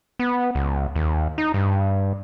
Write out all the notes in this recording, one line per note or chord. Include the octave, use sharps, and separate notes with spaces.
B3
C#2
D#2
D#4
G2